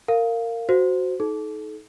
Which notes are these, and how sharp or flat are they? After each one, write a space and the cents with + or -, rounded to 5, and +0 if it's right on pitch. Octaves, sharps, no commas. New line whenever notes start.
A#4 -25 F5 +0
F#4 +0 C5 -10
D#4 +25 A4 -35